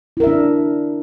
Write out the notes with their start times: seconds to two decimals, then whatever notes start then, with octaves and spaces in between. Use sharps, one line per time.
0.17 E4
0.20 A#4
0.24 E5
0.27 D4